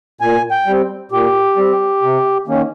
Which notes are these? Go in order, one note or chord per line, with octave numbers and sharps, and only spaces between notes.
A#2 G#5
G5
G3 C4
A#2 G4
G3 C4
C3
D#3 A#3 C#4